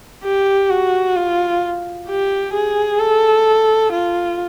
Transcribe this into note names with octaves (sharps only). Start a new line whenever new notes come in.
G4
F#4
F4
G4
G#4
A4
F4